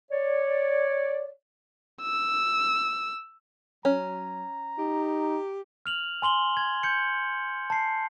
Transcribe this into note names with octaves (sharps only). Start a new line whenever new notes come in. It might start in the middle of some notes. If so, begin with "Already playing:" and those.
C#5 D5
E6
F#3 C#4 A#5
D#4 G4
F6 F7 F#7
G#5 C6 F#7 G7
G#6
G6 C#7
A5 C7